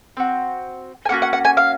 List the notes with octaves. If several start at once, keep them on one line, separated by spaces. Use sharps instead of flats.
C4 F#4
G#5
A#3 C#4 F#4 F#5
F#5
F#5
G#5
F5